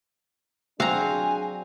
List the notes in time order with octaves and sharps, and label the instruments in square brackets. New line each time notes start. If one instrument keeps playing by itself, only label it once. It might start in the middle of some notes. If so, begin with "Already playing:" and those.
[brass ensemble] F#3 D4 G#4 [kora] C4 F#4 [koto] F5 A#5 [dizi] G#5